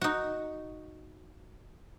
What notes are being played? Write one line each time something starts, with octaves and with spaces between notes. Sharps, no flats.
D#4 F#4